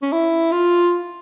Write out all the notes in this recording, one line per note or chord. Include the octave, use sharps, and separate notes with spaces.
C#4
E4
F4